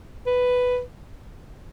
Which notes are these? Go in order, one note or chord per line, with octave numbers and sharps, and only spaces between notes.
B4